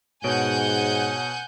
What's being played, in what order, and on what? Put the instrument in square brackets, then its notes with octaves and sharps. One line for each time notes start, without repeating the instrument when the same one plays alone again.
[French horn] G#2 [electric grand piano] B2 C#5 D7 [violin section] F#5 G#5 G6